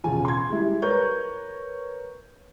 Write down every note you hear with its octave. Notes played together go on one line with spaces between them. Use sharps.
E1 A1 C#3 F4 G#5
C6 G#6
G3 G#3 E4
A#4 B4 C#5 C#6 G6